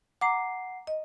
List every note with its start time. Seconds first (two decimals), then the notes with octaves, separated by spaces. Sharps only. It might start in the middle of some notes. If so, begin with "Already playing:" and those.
0.21 F#5 A#5 D6 C7
0.87 D#5